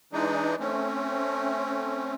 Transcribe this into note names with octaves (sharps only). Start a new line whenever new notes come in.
E3 G#3 D4 D#4
A3 C4 C#4